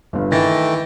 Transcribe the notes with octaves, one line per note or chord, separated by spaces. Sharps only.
G1 G2
D#3 E3 A3 G5 A6 A#6